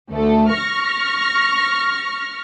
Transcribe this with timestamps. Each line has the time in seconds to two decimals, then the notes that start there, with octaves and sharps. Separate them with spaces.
0.11 D2 A3 A4
0.53 C#6 F6 A#6